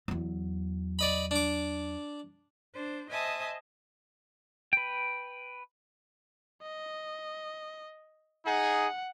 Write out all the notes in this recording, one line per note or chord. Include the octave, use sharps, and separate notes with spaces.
E2 F#3
D5 D#5 B5
D4 D6
D4 C5
C5 D#5 E5 G#5 A5 D#6
B4 G5
D#5
D#4 G#4 F#5